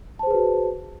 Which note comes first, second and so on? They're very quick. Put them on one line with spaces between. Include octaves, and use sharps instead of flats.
A5 C5 G#4 B4 F#4